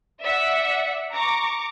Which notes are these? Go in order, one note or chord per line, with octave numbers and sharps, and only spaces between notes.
D5 E5 F#5
A#5 C#6 D6